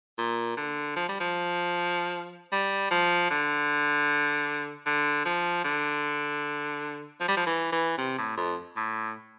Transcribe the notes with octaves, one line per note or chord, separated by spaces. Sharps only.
A#2
D3
F3
G3
F3
G3
F3
D3
D3
F3
D3
F3
G3
F3
E3
E3
C3
A2
F2
A2